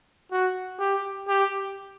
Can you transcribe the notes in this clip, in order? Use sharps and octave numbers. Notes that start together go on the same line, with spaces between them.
F#4
G4
G4